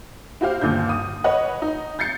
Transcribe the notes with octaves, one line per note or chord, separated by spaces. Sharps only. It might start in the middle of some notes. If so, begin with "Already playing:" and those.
E4 F#4 G4 C5 F5
G1 D#2 A#2 D3 G6
D#6
B4 C#5 D#5 F#5
D#4
G6 A6 C7 C#7